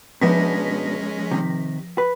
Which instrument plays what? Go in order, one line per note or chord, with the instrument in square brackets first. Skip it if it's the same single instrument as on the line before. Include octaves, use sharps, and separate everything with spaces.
[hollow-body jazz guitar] B2 B3 D4 [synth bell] F3 A#6 B6 [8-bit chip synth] G#3 C#4
[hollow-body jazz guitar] C3 D#3
B4